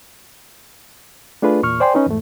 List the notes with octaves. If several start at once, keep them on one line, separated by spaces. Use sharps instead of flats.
A3 D4 F4 G#4 B4
E2 A#2 C#6 F6
C5 D5 G5 G#5 C6
C#4 D#4 B4
E2 G#2 A3